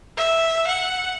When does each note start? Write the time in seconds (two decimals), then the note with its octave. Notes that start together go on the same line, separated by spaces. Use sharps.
0.18 E5
0.67 F#5